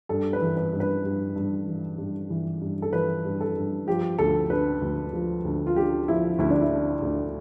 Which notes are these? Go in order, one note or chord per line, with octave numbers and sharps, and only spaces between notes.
G2 A4
B4
E3
B4
G2
B4
G2
G2
E3
G2
E3
G2
A4
E3 B4
G2
A4
G2
F3 G4
D2 A4
D3 B4
D2
F3
D2
F4
D3 G4
F3 E4
D2 E4
D4
E4
D3
D2